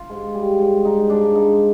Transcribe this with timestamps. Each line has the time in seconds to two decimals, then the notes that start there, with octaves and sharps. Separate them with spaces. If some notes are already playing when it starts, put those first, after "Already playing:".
Already playing: F4
0.10 G#2
0.35 G3
0.60 G#2
0.85 G#2 D#4
1.10 G#2 D4
1.35 G#2 D#4